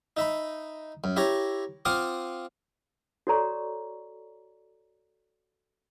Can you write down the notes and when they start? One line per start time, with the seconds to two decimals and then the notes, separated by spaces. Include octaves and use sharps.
0.17 D#4 E5 B5
1.04 F#2
1.16 E4 G4 C#5 A#5
1.85 C4 F4 F5 F#5 D6 D#6
3.27 F#4 A4 C#5 D5 A#5 C#6